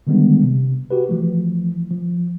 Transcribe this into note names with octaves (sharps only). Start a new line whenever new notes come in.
D3 D#3 G3 G#3 B3 D4
C3
F#4 G4 B4
E3 F3 A3
F3